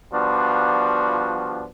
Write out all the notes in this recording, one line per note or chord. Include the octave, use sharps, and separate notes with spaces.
F3 G3 B3 D4 F4 F#4